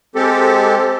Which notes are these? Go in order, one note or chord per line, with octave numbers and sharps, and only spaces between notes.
G#3 C4 G4 A4